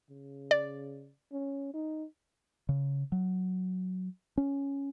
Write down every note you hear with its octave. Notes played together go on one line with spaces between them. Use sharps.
C#3
D5
C#4
D#4
C#3
F#3
C#4